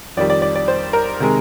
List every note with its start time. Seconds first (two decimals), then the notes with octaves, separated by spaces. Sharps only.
0.17 F2 D#3 G3 D5
0.30 D5
0.42 D5
0.55 D5
0.68 C5
0.93 A#4
1.20 C3 D#3 G#3